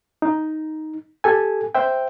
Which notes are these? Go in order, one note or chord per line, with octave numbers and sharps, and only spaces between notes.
D#4
G4 A4 G#5
C5 E5 G5